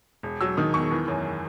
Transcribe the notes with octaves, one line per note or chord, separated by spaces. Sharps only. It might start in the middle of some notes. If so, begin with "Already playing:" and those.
E1
F#3 E6
D#3 D#6
E2 C#6
E3
F#2